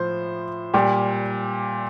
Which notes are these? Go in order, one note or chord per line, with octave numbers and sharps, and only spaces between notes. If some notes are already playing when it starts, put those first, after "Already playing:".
Already playing: A2 F3 C5
A#2 G3 G4